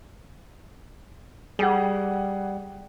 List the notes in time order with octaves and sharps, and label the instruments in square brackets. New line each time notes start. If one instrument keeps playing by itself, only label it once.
[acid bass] G3 [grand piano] G#4 F#5